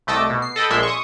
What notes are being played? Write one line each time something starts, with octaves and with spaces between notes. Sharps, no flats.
C2 A3 D#5 D6 E6
B2
C7
A4 D#5 G5 B5
A#1 A#2 G#3 E5 C6
C#6 D#6